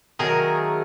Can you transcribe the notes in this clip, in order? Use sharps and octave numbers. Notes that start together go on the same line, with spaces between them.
D#3 F#3 A3 G#4 A#4